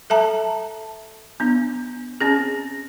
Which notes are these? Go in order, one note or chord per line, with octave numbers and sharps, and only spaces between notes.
A4 E5 A5 A#5
B3 D4
C4 C#4 G#4